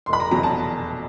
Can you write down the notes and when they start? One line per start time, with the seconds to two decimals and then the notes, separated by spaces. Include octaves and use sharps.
0.06 C6
0.09 F1 B5
0.20 A#5
0.31 E2 B2 F#3 A#5
0.43 A5